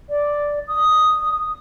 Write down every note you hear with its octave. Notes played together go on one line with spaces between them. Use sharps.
D5
D#6